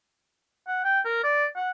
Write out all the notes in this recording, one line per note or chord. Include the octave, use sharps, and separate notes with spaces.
F#5
G5
A#4
D5
F#5